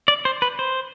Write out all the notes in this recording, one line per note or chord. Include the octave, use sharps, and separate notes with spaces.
D5
C5
B4
C5